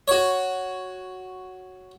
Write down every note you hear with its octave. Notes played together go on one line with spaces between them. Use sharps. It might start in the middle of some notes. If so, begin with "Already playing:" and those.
F#4 C#5